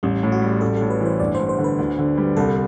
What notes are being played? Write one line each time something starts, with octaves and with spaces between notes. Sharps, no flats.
A1 G3
A2
F#4
G3
A1 A4
A2 A4
B4
E3 C5
G1 D5
G2 C5
C5
D3
B4
D2
D3
G3
C2 A4